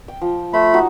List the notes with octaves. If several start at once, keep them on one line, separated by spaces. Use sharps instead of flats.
G5
F3
A3 C5 B5
D#4 F#4